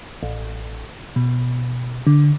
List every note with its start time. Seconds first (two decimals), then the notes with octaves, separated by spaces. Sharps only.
0.23 A1
1.16 B2
2.07 D3